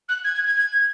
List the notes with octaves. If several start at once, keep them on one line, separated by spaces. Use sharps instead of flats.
F#6
G#6
G#6
G#6
G#6